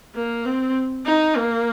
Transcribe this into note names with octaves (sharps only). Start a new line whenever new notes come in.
A#3
C4
D#4
A#3